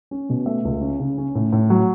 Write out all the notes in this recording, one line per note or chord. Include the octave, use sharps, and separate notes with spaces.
C#4
B2
A3 E5
C#2
C#4
C#3
C#4
A2
A2
F#3